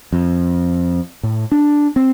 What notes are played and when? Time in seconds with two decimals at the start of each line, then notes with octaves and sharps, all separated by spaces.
0.13 F2
1.23 A2
1.52 D4
1.96 C4